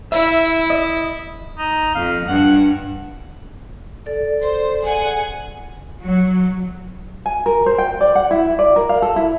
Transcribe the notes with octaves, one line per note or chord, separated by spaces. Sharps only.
E4 E5
D#5
D#4
F2 F5
G2 F#5
A4 D5
C5
G#4 F#5 G#5
F#3
G#5
A#4
C5
G5
D5
F#5
E4
D5
A#4
F5
A4
E4